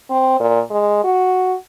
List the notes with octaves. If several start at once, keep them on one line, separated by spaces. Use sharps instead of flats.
C4
A#2
G#3
F#4